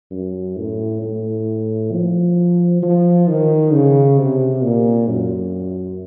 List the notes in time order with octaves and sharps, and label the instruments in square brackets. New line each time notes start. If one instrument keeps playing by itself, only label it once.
[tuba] F#2
A2
A2
F3
F3
D#3
C#3
C3
A#2
F#2